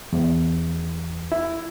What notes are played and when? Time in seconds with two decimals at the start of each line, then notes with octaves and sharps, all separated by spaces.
0.13 E2
1.32 E4